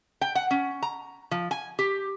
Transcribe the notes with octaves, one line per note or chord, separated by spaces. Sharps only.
G5
F#5
C#4
A#5
F3
G#5
G4